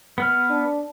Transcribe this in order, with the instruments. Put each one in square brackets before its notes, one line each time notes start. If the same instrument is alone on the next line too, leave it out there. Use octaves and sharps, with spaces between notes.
[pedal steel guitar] B3 B4 F6
[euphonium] D4